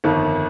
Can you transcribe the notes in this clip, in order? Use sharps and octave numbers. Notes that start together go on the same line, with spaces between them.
G1 F2 D#3